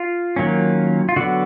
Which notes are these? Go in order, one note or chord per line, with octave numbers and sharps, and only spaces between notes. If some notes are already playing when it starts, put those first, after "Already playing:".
Already playing: F4
D#3 F#3 A#3 C#4
F4
D3 F#3 B3 F#4